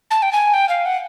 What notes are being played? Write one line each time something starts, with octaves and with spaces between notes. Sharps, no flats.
A5
G5
G#5
G5
F5
F#5